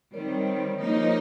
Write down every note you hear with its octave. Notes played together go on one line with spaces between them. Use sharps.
D#3 G3 C4 A#4 C#5
F3 A#3 D#4 A#4 C#5
G4 A#4